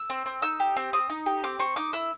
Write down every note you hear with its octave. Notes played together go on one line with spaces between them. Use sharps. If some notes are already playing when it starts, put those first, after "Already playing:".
Already playing: E6
C4
C4
D#4 E6
G4
C4
C4 D#6
D#4
G4
C4 D6
C4 C#6
D#4 D6
E4 E6